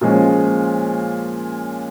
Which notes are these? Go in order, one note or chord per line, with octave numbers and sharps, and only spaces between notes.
A#2 F3 G#3 C#4